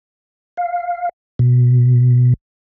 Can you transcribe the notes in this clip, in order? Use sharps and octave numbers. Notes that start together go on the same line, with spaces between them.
F5
B2